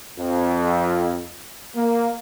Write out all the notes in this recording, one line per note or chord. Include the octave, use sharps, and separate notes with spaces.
F2
A#3